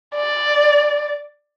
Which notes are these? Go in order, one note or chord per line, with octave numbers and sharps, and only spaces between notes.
D5